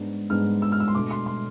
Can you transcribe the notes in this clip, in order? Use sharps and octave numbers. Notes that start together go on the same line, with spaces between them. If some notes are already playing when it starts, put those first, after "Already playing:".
Already playing: G#2 G#3 B3 D4
G#2 G#3 B3 D4 F6
E6
F6
E6
C6
B2 A3 D4 D6
C6
C6